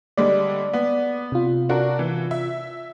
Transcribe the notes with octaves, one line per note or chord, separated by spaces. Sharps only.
D3 G3 G#3 D5
B3
C3 F4
D4 F#4 A#4
E3
E5